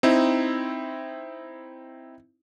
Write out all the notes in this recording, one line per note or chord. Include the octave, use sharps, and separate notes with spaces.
C4 D#4 E4